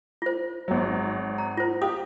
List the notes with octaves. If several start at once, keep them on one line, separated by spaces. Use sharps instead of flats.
F4 C5
G#1 F#3
A#5
F4 C5
G4 D#6